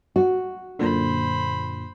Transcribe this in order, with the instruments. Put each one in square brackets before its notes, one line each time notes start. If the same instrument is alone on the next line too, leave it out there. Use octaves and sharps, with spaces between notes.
[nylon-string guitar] F#4
[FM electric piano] F#2 A#2 D3 [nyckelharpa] C5 B5